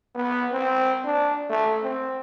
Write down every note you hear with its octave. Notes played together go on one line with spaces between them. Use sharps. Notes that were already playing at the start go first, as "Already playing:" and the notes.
B3
C4
D4
A3
C4